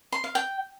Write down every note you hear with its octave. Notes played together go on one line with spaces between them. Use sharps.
C6
F5
G5